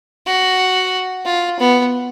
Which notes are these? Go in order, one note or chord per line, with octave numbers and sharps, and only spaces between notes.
F#4
F4
B3